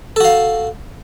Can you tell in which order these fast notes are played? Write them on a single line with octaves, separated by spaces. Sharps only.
A4 F#4 F5